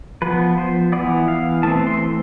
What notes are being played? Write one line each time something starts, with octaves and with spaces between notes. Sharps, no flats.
F3 B3 B4
C5
E3 B3 D5
F5
E3 A3 C4 A5
C6